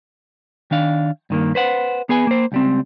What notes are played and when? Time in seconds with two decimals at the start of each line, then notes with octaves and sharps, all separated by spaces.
0.71 D#3 D4 F5
1.30 G2 D#3 A#3
1.55 B4 C5 F#5
2.09 B3 G#4 B4 G#5
2.27 A#3 C5
2.52 C#2 G3 C4